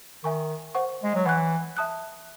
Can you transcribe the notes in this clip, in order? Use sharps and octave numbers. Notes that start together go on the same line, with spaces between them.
D#3 E5 G#5 C#6
C5 F#5 C#6
G#3
F#3
E3 F#5 C#6 F#6
E5 A5 D#6 F#6